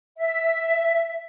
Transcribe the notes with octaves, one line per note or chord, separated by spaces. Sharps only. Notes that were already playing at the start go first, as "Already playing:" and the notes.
E5